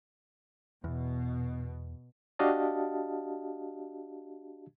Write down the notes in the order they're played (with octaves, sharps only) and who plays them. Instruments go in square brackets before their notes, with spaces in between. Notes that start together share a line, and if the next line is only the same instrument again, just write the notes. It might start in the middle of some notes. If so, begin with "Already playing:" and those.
[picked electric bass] E2 [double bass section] B2
[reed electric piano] D4 F#4 G4 D#5 F5 A5